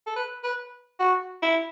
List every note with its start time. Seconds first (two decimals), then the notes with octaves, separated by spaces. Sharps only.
0.07 A4
0.16 B4
0.43 B4
1.00 F#4
1.42 E4